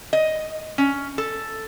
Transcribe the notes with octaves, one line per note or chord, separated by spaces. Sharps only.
D#5
C#4
A4